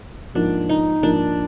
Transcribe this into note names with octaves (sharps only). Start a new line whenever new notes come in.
G#2 F3 A#3 D4
D#4
G#2 F3 A#3 D4